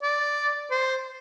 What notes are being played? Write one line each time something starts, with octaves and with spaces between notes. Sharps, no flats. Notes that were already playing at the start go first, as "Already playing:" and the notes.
D5
C5